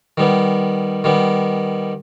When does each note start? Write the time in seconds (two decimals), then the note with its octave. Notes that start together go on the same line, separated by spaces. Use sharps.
0.17 D#3 G3 B3
1.04 D#3 G3 B3